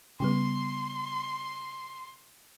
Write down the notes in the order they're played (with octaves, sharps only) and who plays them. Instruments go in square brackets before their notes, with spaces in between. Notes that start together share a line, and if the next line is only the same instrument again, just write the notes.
[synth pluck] C#3 G3 B3 [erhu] C6